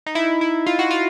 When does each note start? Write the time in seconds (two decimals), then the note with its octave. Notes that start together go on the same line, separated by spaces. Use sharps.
0.06 D#4
0.15 E4
0.41 E4
0.66 F4
0.79 F#4
0.91 F4